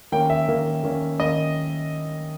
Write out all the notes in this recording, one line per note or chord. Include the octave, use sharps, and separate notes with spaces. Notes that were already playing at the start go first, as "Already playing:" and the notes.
D#3 A#3 C#4 G5
E5
D#3 A#3 C#4
D#3 A#3 C#4
D#3 A#3 C#4 D#5